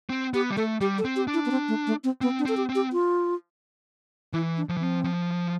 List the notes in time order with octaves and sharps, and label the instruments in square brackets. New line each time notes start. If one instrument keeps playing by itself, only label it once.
[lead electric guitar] C4
[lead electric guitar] B3 [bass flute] G4
[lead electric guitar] G3
[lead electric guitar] A3 [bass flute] A4
[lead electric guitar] G3 [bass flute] G4
[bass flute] A4
[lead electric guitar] C4
[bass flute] G4
[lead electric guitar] D4
[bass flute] E4
B3
C4
A3
A3
C4
[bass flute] B3 [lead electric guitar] C4
[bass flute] D4
[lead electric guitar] C4 [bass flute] A4
[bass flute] G4
[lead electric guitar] C4
[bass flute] G4
F4
[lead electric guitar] E3 [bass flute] E4
[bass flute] D4
[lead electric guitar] F3
E3
[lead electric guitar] F3 [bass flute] C4
[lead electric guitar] F3